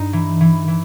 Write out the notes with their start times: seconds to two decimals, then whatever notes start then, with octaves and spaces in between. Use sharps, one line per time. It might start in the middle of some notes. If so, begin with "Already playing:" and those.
Already playing: G2 D#4
0.13 E3
0.41 E3
0.68 E3